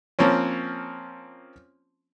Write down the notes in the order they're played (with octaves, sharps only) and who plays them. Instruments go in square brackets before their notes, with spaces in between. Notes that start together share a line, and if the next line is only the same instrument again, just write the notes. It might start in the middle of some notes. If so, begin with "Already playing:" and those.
[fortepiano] F3 A#3 C4 C#4